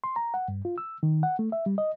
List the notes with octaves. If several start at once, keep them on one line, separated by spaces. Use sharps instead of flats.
C6
A#5
F#5
G2
F4
E6
D#3
F#5
A3
E5
G3
D#5